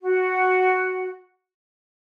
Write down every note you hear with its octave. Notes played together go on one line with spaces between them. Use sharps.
F#4